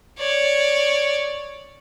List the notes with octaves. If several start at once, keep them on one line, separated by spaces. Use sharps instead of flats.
C#5 D5